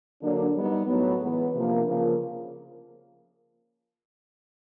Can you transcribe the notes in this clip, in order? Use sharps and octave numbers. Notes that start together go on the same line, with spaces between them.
D3 F#3 A#3 D4
G3 B3 D#4
A2 F#3 B3
E3 G#3 B3
C3 F3 A#3 D4
C#3 F3 A#3